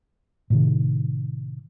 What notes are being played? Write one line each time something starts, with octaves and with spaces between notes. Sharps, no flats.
A2 C3 D#3